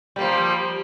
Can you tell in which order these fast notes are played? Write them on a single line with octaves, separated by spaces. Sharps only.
G3 A#3 F3